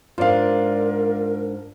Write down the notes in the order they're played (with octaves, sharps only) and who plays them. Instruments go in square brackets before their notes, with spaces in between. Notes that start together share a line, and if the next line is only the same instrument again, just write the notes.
[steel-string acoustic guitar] G#2 D4 [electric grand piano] F4 D5 F5 [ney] A#4